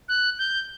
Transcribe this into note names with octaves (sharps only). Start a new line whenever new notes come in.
F#6
G6